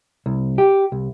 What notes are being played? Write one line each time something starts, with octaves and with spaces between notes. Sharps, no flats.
C2
G4
C2